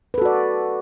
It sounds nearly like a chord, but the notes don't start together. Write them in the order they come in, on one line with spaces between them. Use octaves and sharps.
B4 A4 F#4 D5